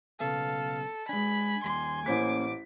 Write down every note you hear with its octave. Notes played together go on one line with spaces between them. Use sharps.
B1 C#3 B3 A4 F5
G#3 D4 G#5 B5
D#2 G3 C6
A1 A#3 C#4 C5 D6 B6